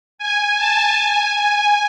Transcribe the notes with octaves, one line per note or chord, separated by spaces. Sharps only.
G#5
A5
G#5